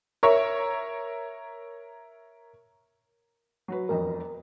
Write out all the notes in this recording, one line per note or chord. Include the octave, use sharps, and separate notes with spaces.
A#4 C#5 E5
F#3 F#4 B4
E1 F2 A#4 D#5